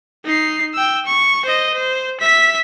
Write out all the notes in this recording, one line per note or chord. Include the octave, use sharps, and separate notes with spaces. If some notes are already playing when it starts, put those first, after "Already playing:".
D#4 C7
G5 E6
C#6
C5 D#5
C5
E5 B6